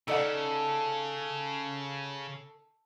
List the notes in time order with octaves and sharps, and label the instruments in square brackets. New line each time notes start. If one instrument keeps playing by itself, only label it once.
[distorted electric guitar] C#3 [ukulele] D#4 D5 F#5 [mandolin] A4